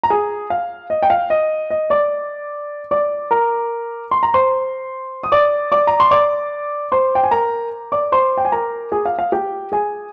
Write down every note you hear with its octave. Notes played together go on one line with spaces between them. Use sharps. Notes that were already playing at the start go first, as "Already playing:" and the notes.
A#5
G#4 G#5
F5
D#5
G5
F5
D#5
D#5
D5 D6
D5 D6
A#4 A#5
C6
A#5
C5 C6
D#6
D5 D6
D5 D6
A#5
C6
D5 D6
C5 C6
G5
G#5
A#4 A#5
D5 D6
C5 C6
G5
G#5
A#4 A#5
G#4 G#5
F5
F5
G4 G5
G#4 G#5